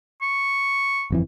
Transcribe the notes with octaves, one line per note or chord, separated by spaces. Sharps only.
C#6
G1 F2 E3